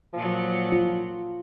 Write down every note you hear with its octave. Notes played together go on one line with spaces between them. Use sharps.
A#2 F3 F#3
F4